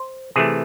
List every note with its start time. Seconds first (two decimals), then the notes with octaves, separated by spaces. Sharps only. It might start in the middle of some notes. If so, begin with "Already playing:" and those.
Already playing: C5
0.36 C3 E3 A3 G#4